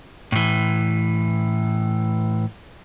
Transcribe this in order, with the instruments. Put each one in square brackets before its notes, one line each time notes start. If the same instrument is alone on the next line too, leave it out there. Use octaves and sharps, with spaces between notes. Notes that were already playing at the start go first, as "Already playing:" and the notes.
[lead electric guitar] A2 E3